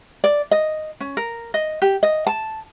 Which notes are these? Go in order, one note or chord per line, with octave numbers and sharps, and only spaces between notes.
D5
D#5
C#4
A#4
D#5
G4
D#5
A5